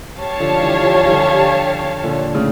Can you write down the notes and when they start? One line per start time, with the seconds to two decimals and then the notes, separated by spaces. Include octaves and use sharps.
0.20 G4 C#5 F5 A5
0.39 D3 F3
0.61 E3 G3
0.81 D3 F3
1.07 G3
1.11 D3 F3
2.04 A#2 D3
2.35 A2 C#3